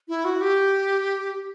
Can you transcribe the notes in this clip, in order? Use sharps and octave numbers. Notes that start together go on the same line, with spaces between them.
E4
F#4
G4